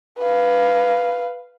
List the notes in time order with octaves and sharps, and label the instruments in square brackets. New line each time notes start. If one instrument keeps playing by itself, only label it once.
[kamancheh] B4 F5